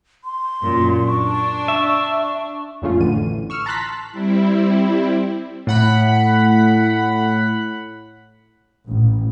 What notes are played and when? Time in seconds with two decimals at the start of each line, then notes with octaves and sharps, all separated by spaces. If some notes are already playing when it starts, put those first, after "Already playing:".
0.24 C6
0.62 F#2 A#2
1.07 D4 C#6
1.68 E5
2.82 F2 A#2 C#3 A3 C#4 F4
3.00 A1 A2 D3 E3 D#7
3.50 C#6 E6 F6
3.66 A5 A#5 C6 F#6 A6 B6
4.12 G3 C4 E4
5.67 A2 F#5 B5
8.86 A1